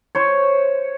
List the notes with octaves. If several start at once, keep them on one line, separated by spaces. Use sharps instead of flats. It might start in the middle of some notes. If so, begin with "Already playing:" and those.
C5 C#5